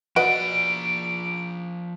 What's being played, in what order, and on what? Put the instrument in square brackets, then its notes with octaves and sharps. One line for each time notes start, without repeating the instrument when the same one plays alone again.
[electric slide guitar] F3 D5 [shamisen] F#4 B4 D#5 [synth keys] D7